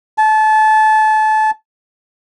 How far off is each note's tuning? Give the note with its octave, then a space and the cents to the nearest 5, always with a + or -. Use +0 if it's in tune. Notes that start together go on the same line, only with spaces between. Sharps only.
A5 -25